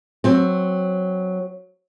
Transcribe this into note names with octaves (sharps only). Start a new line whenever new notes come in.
F#3 C4